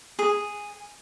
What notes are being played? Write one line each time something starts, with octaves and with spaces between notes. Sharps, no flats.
G#4